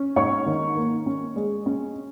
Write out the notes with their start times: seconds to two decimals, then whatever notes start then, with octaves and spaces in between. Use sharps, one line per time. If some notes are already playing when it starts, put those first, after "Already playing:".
Already playing: C#4
0.16 G#2 C#5 C#6
0.46 D#3
0.76 A#3
1.06 C#4
1.36 G#3
1.66 C#4